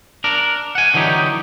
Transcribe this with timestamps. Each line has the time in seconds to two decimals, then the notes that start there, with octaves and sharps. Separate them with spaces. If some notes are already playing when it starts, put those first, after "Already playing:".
0.24 D4 A#4
0.75 F#5 G#5
0.94 D3 E3 F#3 D#4 G4